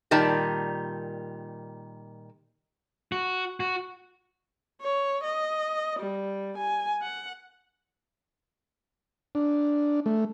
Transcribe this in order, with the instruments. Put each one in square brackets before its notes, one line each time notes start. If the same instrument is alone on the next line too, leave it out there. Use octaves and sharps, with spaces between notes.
[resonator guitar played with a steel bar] A#2 D#3 G3 A5
[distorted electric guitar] F#4
F#4
[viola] C#5
D#5
G3
G#5
F#5
[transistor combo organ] D4
A3